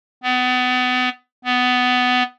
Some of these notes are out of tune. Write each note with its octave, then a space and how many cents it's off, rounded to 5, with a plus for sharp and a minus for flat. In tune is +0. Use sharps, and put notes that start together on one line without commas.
B3 +30
B3 +15